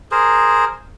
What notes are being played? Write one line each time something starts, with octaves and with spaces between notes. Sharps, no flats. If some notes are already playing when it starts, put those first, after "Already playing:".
G#4 A#4 C5